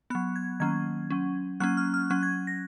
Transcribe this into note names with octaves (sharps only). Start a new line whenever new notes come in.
F#3 B3 F#6
G#6
D#3 F#3 A#3 C#4 G#6
F#3 C#4
F#3 A#3 C#4 F#6
F6
F6
F#3 C#4 F#6
G#6
A#6